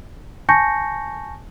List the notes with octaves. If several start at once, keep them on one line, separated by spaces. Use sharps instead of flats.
G#5 A5 C#6 G6 A#6 C#7